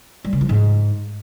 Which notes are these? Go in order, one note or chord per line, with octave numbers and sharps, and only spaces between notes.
G3
C#3
F3
G#2